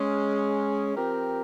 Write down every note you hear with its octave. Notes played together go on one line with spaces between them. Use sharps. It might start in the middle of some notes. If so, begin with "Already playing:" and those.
Already playing: G#3 C#4 G#4
F3 C4 G4 A#4